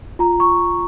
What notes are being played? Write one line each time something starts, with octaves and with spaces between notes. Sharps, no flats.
F4 A#5
C#6